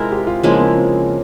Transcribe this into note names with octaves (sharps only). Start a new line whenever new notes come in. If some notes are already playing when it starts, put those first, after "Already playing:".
Already playing: C3 G#3 E4 F4 A#4
G4
F4
C#3 F3 G#3 A#3 E4
A#3
C4